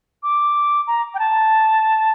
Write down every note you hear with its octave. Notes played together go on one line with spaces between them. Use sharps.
D6
A#5
G5
A5